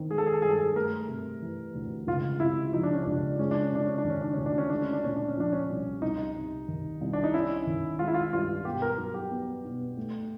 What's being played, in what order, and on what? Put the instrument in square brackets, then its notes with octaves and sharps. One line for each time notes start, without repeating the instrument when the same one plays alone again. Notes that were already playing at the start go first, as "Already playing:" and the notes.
Already playing: [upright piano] D#3 C4
[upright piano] G#3 [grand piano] G#4
[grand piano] A4
G#4
A4
[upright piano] G2 [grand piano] G#4
[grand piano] A4
G#4
[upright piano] A3 [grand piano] A#4
[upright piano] C3
E3
D2
[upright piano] C#2 [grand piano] F4
[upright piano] C3 [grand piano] E4
[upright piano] F3 [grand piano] D#4
[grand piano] D4
C#4
[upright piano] C#2 [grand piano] D4
[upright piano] G#3 [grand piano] C#4
[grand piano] D4
C#4
[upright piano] C3 [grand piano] D4
[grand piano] C#4
D4
[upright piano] D#3
[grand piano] C#4
D4
[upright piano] D2 [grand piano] C#4
[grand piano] D4
C#4
[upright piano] G#3 [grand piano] D4
[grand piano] C#4
D4
[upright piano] A#2 [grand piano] C#4
[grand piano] D4
C#4
[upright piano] F3 [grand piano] D4
[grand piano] C#4
[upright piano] C2
[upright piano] C2 [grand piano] D#4
[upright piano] C3
D#3
C2
[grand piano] D4
D#4
[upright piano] C#4 [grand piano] E4
[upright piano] D#3
[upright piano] G#3 [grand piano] F4
[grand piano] E4
F4
[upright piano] G2 [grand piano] F4
[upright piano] B2 [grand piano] G4
[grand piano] A#4
[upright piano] F#3
[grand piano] G4
[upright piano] B3
B2
A3